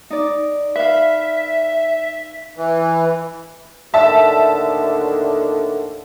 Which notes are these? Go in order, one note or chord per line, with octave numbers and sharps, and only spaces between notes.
D#4 D5
B4 E5 F5
E3
D#2 A2 D3 E5 A5